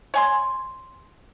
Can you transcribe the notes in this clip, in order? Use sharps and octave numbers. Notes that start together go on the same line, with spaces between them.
C#5 G#5 C6